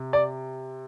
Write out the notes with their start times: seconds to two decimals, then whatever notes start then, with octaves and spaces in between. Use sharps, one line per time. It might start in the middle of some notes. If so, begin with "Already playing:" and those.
Already playing: C3
0.13 D5